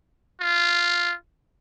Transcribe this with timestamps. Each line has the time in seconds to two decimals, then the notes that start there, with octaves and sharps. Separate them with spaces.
0.40 F4